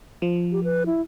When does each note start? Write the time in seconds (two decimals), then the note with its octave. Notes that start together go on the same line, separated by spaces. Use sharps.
0.22 F3
0.52 G4
0.64 B4
0.86 E4